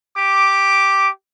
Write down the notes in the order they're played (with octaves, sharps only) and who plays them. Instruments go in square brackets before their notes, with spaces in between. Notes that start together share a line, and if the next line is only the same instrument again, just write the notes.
[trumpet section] G4 D6